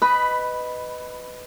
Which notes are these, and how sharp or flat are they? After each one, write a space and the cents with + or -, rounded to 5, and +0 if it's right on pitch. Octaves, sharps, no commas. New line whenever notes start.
B4 +15 D#5 +0 B5 +0